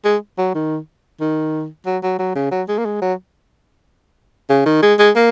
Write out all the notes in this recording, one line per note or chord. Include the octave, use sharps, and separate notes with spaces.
G#3
F#3
D#3
D#3
F#3
F#3
F#3
C#3
F#3
G#3
A#3
G#3
F#3
C#3
D#3
G#3
G#3
A#3